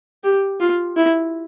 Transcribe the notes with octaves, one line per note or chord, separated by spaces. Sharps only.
G4
F4
E4